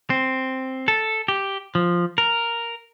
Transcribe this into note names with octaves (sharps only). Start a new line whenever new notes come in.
C4
A4
G4
F3
A#4